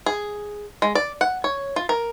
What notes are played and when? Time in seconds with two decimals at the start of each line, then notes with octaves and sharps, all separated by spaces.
0.06 G#4
0.82 G#3
0.95 D5
1.21 F#5
1.44 C#5
1.76 F4
1.89 A#4